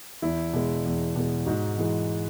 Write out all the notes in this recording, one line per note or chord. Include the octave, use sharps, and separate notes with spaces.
E2 E4
B2 G#3
E2
B2 G#3
G#2 D#4 F#4
E3 G#3